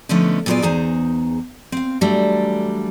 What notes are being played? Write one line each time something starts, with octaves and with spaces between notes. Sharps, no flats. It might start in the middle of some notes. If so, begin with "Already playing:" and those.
D3 F3 A3 B3 C#4 D#4
A#2 F#3 B3 F4 G#4 D5
E2 D#4 G#4 C5 A#5
C4 F5
D3 E3 F#3 G3 A3 D4